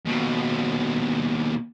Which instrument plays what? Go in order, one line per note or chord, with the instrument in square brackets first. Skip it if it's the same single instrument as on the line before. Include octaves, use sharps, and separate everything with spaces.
[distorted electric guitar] D#2 B2